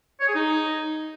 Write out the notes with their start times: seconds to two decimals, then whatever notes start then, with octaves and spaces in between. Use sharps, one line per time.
0.20 C#5
0.27 G#4
0.35 D#4